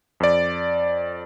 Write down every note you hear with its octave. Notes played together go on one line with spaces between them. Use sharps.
F2 D5